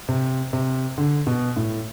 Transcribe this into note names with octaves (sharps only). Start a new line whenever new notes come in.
C3
C3
D3
B2
A2